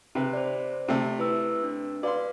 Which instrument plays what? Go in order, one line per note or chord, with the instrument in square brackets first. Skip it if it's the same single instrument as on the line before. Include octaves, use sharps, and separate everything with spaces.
[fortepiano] C3 B4
[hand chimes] C5 D5
[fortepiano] C3 A3
[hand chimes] E4 B4 E6
D4
[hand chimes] F#4 B4 F5 [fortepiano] D5 C6